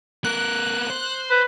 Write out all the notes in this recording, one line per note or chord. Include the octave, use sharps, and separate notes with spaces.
B3 A#4 F#6
C5
B4